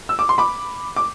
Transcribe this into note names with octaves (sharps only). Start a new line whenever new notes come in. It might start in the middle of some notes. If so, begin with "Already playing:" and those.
E6
D6
C6
B5 D6
D6